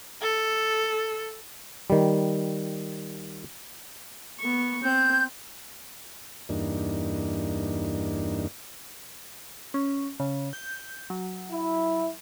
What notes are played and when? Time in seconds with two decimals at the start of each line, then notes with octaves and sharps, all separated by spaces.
0.22 A4
1.90 D#3 G3
4.40 B3 C#6
4.83 C4 G6
6.49 E2 G2 A#3 D4 D#4
9.74 C#4
10.20 C#3
10.53 G6
11.10 F#3
11.51 E4